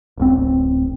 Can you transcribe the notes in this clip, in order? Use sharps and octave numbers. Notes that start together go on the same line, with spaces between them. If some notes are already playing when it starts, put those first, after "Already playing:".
D1 A1 C4